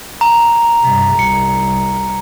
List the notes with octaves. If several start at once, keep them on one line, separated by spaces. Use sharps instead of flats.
A#5
G2 C3
C2 C#7